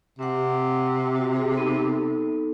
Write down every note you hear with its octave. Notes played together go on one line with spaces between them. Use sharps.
C3 C4 F#5
F#4
G#4
B3 D#4 A4